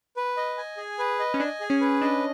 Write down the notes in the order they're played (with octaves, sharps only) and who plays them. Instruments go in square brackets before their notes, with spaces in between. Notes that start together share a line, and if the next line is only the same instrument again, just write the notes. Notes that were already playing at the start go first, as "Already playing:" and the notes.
[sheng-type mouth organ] B4
D#5
G#5
G#4
B4
D#5
[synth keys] C#4
[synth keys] D4 [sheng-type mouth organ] G#5
[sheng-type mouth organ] G#4
[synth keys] C#4
[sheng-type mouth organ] B4
[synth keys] D4 [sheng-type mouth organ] D#5